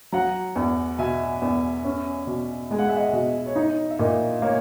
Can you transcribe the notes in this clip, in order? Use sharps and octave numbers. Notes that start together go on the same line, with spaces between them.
F#3 F#5 A#5
E2
B2 E5 G#5
E2
C#4
B2
G#3 G#5
F#5
E5
D#5 F#5
B2
C#5
D#4 D#5
E5
A#2 D#5
A#3 C#5